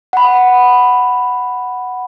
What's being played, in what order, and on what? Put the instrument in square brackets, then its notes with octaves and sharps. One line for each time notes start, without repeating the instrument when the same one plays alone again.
[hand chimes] F#5 B5